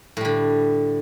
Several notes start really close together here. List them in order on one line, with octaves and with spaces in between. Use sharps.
A2 G3 D3